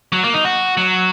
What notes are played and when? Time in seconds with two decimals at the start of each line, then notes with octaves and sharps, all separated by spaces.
0.12 F#3
0.24 A#3
0.34 D#4
0.44 F#4
0.77 F#3